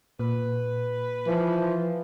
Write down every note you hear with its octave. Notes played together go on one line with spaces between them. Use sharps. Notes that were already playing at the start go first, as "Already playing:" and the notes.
A#2 B4
E3 F3